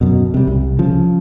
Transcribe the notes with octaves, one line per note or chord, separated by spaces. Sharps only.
F#2 B2
C3 G3
C2
C#3 F3